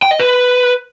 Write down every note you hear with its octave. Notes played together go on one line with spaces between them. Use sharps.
G5
D#5
B4